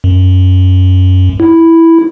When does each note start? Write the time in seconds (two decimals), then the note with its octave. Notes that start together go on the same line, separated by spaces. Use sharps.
0.04 F#2
1.40 E4